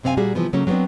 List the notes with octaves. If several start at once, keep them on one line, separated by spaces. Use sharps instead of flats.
F#2 C3 C4 D4 F5 G#5
A#2 G3 A#3 F#4 G#4
C3 E3 F3 B3
C#3 F#3 A3 A#3 C#4
F#3 G#3 B3 C4 D4